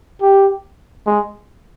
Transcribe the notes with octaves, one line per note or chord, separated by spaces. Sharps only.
G4
G#3